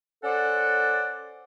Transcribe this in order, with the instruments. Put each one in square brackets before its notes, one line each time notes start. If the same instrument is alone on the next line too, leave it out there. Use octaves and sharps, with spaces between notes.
[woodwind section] C#4 A4 C5 D5 F#5